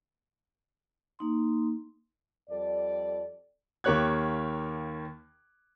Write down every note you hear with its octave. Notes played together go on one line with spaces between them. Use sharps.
A#3 D#4 C6
F2 G3 A4 D5
D#2 A#3 G4 C#5 F#6 G#6